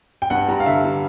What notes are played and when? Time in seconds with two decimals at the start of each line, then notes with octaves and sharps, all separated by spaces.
0.22 G5
0.30 G2 F#5
0.49 G3 A#5
0.60 F5
0.66 D3 E5
0.84 G3